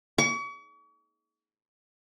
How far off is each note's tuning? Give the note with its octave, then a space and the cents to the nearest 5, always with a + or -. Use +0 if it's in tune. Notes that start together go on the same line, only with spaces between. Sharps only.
C#6 +40